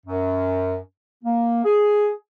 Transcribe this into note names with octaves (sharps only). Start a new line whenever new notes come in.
F#2
A#3
G#4